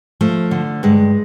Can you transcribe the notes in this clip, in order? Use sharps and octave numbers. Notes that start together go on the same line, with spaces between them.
F3 A3
D3
G2 G#3